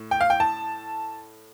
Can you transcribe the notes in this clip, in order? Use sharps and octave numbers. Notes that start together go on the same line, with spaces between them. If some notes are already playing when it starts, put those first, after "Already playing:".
Already playing: A2
G5
F5
G5
A5